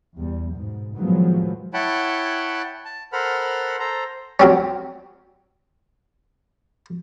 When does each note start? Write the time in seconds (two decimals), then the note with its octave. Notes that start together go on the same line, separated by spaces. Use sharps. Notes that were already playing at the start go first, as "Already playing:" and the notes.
0.17 E2 G3
0.54 G#2 B2
0.97 A2 D#3 F3 F#3 G#3 B3
1.74 E4 C#5 F#5 G5 A5 B5
2.85 A5
3.13 A4 A#4 C5 F#5 B5 F6
3.79 A4 C5 A#5
4.40 F#3 C4 C#4